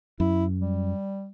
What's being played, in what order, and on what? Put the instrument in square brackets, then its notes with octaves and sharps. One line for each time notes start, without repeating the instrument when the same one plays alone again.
[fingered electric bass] F#2 [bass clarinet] E4
[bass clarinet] G3